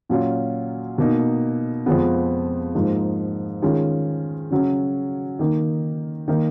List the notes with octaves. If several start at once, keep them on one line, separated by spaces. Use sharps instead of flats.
A#2 F#3 C#4 F4
B2 A#3 D#4
F2 F3 G#3 B3
G#2 F3 A#3 D#4
D#3 G#3 C#4 F4
C#3 F#3 C#4
D#3 A#3 D#4
D#3 A#3 D#4